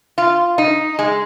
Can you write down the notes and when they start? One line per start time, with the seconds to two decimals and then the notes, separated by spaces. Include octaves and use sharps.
0.18 F4
0.58 D#4
0.99 G#3